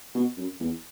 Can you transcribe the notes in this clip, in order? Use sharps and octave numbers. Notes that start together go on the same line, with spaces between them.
B2
F#2
E2